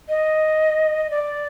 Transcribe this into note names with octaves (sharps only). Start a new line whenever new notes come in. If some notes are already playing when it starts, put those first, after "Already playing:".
D#5
D5